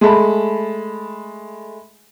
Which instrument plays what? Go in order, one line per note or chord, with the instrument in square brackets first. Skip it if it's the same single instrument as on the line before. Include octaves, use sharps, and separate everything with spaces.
[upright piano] G#3 A3 A5 B5